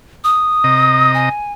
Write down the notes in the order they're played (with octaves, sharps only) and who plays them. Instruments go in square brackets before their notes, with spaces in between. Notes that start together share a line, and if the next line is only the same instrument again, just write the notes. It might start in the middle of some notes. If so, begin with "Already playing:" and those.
[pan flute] D#6
[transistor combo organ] C3 D#5 A#5
[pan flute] G#5